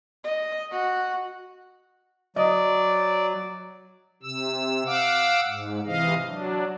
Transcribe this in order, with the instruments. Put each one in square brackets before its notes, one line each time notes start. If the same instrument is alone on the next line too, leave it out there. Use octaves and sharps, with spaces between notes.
[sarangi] D#5
F#4
[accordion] F#3 [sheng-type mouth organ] D5 [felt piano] D#5 D#6
[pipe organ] C3 E6
F5 F#5 D6 E6
G#2
C3 E3 D#5 F5
F#3 D4